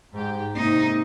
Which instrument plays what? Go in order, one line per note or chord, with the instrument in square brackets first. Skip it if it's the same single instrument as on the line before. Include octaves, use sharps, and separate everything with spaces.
[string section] G#2 G4
[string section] G#2 C3 [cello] A#3 D#4